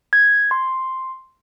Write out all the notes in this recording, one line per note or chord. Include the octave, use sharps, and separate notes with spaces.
G#6
C6